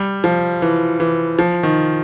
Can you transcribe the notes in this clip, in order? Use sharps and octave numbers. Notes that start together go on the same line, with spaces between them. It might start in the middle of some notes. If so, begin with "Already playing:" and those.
Already playing: G3
F3
E3
E3
F3
D#3